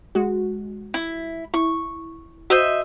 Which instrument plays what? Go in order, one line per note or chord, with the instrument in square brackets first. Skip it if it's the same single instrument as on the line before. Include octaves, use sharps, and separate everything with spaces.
[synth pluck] G#3 F#4
[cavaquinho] E4
[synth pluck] E4 [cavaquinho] C#6
[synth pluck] F#4 [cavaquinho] C5 D#5 E5